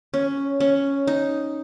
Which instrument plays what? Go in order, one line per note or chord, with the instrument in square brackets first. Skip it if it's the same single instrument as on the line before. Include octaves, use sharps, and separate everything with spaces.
[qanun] C#4
C#4
D#4